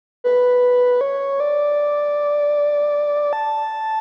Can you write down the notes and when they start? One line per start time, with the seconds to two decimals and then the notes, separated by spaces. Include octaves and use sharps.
0.24 B4
1.01 C#5
1.40 D5
3.33 A5